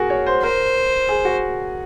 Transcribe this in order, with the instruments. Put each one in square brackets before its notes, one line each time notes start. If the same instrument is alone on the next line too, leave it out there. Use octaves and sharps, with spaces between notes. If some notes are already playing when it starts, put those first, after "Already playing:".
Already playing: [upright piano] F#4 G#4 A#4
C#5
C5
[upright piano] A#4 [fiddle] C5
[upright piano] G#4
F#4